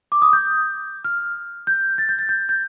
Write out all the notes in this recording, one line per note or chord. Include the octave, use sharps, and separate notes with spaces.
D6
D#6
G6
F6
G6
A6
G6
A6
G6
G6